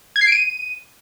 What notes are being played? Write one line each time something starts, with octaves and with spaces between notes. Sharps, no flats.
G#6
C7
D7
D#7